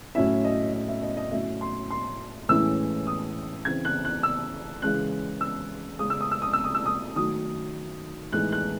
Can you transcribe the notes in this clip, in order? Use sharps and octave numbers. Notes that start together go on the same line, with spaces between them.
A2 F#3 C#4 E4 E5
D#5
D#5
E5
D#5
D#5
A2 F#3 C#4 E5
C6
C6
A2 E3 G#3 C#4 E4 E6
D#6
C#3 E3 C4 G#6
F#6
F#6
E6
C#3 E3 G#3 C#4 F#6
E6
C#3 G#3 C#4 D#6
E6
D#6
E6
D#6
E6
D#6
E6
D#6
D#3 F#3 A3 D#6
A2 E3 G#3 D#4 F#6
F#6